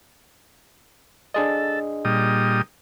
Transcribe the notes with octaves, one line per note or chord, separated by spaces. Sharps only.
D4 G#4 A4 D#5
A#2 G3 D#6